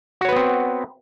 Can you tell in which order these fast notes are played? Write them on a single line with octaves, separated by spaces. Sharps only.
F#4 C#5 B4 B3 C4